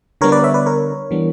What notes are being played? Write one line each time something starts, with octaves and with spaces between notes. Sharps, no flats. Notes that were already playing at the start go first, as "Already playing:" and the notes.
D3 G3 B3 D4 A#4 C#5
B4 D5
C#5 E5
B4 D5
A#4 C#5
E3 G3 B3 D4